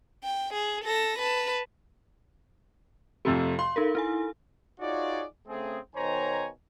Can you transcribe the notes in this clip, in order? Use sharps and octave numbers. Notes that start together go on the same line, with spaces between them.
G5
G#4
A4 A#6
B4 A5
F2 C3 A3
F5 C6
D#4 A4 A#4
E4 A4 G#5
D#4 F4 F#4 G#4 C#5 D5
C#3 A3 C4 G#4
B2 D#3 C5 C#5 G#5 A#5